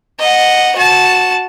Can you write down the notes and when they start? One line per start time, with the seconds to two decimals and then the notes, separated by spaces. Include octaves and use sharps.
0.19 D#5 F#5
0.76 F#4 A5